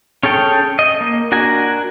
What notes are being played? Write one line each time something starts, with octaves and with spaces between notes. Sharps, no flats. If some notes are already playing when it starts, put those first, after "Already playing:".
C#4 G#4 A4 G5
D#5
A#3
D4 F#4 A#4 G#5